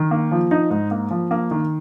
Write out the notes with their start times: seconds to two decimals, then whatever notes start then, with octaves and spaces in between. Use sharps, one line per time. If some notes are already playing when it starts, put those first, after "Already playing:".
Already playing: D#3
0.11 A#3
0.31 F3
0.51 D#4
0.70 G#2
0.91 A#3
1.11 F3
1.31 A#3
1.51 D#3